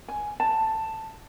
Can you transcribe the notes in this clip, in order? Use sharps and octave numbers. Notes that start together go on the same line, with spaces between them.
G#5
A5